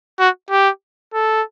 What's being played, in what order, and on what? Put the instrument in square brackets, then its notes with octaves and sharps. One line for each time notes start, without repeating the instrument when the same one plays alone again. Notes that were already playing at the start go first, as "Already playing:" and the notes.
[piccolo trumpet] F#4
G4
A4